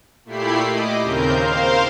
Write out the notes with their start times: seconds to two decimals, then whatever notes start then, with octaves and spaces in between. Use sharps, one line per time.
0.25 A#2 A3 E4 G4 B5 C7
0.67 D#5 D6
1.02 D#2 C#3 C4 A#4 G6
1.33 A#4 C5 F5 C6